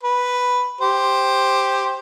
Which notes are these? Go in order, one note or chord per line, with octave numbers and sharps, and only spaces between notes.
B4
G4 C5